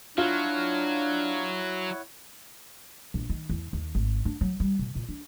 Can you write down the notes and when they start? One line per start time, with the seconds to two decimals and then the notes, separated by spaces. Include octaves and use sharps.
0.18 F#3 D4 E4 F4 C#5 F#5
3.14 A#1
3.29 D#3
3.50 E2
3.73 D#2
3.95 G#1
4.25 D4
4.41 F#3
4.60 G3
4.79 B2
4.95 A#2
5.09 D4